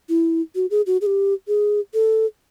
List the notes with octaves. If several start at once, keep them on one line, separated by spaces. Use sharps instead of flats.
E4
F#4
G#4
F#4
G#4
G4
G#4
A4